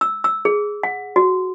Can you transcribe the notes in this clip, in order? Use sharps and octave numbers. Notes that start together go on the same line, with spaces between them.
E6
E6
G#4
F#5
F#4